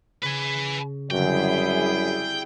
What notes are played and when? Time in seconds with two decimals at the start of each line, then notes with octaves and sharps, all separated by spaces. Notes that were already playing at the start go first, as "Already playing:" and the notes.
0.23 C#3 B4 G#5
1.11 F#2 D3 G3 C4 E4 F#4 G#4 G5